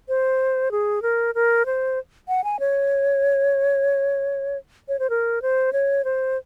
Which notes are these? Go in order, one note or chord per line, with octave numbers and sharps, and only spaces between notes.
C5
G#4
A#4
A#4
C5
F#5
G#5
C#5
C#5
C5
A#4
C5
C#5
C5